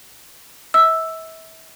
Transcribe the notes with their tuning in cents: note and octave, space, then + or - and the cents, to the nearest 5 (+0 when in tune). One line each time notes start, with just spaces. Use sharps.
E5 -35 E6 +0